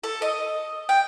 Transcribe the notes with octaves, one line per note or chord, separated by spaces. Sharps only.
A4
D#5
G5